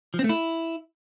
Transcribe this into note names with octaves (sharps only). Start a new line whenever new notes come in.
F3
C4
A3
E4